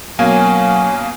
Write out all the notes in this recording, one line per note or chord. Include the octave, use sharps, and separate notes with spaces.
B2 F#3 A#3 C#4 F5 G#5